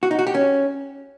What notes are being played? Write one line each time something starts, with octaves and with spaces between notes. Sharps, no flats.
F#4
D#4
F#4
G4
C#4